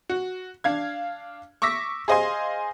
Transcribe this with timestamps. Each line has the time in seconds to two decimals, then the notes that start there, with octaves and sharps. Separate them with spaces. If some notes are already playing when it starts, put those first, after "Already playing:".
0.10 F#4
0.64 D4 F5 G#6
1.62 C#6 D6 E6 A#6 B6
2.08 G#4 C5 D#5 F5 G#5 C6